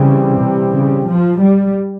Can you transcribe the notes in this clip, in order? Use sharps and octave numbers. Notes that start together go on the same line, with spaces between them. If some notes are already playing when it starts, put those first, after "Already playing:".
Already playing: C#3 E3 G3 C4 G4
C3
C#3
F3
G3